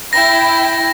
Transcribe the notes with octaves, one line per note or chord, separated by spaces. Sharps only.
E4 G5 A#6